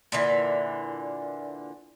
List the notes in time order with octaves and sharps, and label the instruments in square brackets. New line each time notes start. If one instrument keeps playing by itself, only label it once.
[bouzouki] A#2 D3 E3